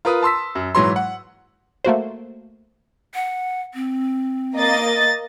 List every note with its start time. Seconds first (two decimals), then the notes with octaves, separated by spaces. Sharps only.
0.05 F4 A#4 B4 D#6
0.23 A5 C6 E6 B6
0.55 F#2
0.75 G#2 E3 F#3 C6
0.96 F#5
1.84 A3 A#3 F#4 C5
3.15 F#5
3.74 C4
4.56 A#3 D#5 A6